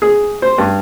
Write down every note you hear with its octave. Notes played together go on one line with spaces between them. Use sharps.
G#4
C5
G2